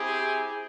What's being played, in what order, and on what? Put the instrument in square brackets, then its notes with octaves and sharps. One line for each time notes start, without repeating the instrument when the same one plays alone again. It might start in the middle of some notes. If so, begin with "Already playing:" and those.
Already playing: [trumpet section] C4 E4 G4 G#4